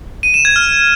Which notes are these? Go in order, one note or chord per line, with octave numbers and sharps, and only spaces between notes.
D#7
E7
G#6
F6